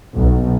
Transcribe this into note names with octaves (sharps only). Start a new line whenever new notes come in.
B1